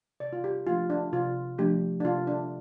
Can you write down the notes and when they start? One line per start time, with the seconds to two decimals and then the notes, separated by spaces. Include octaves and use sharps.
0.20 C3 D5
0.33 F4
0.44 G4
0.67 F3 A3 D4 F4
0.90 D4
1.13 C3 F4
1.58 F3 A3 D4 G4
2.00 D4
2.05 C3 F4
2.27 D4